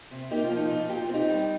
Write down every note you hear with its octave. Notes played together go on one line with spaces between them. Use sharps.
C3
A#3 D#4 G4
F4
F3
D#4
A#2 D#4
A#2 G4
F4
C4
D#4 G4
G3